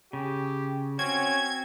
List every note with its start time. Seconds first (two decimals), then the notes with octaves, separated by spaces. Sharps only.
0.13 C#3 G4
0.99 C4 C#4 F#4 G#6